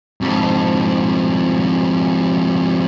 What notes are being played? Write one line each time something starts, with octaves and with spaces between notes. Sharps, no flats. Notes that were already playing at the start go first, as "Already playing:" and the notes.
F2 G#2